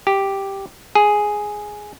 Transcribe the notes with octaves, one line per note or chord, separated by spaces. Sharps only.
G4
G#4